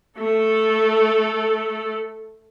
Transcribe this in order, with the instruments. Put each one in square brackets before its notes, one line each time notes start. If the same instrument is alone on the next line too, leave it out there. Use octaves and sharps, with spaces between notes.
[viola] A3 A4